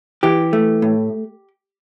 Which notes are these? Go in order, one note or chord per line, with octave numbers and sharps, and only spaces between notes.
E3 G4
A3
A2